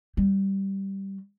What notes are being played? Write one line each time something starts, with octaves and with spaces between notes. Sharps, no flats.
G3